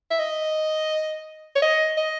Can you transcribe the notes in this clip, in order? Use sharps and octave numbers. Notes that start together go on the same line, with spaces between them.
E5
D#5
C#5
D#5
D#5